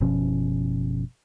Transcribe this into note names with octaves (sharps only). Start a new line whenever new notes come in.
F#1 B2 F3 C#4